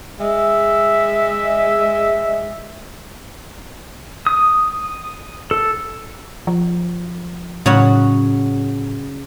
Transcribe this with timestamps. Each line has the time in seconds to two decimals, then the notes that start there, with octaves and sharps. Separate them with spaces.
0.20 G#3 E5
4.27 D#6
5.51 A4
6.47 F3
7.66 A2 C#3 F#3 F#4